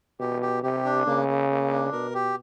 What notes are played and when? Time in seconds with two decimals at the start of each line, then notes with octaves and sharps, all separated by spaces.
0.20 B2 G4
0.42 G4
0.63 C3 G4
0.85 D4
1.06 C#3 A#3
1.28 A#3
1.50 A#3
1.71 D4
1.92 B2 A#4
2.14 G4